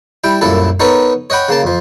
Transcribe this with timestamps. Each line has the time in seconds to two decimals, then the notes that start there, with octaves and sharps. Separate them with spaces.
0.24 G3 E4 G5
0.41 C2 F#2 A#2 E4 A4
0.80 B3 D#4 A4 A#4 C#5
1.30 C#5 D#5 F#5 G5 B5
1.49 C#3 A#3 A5
1.63 F2 F3